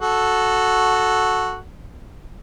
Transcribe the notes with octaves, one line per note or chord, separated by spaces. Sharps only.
F#4 A4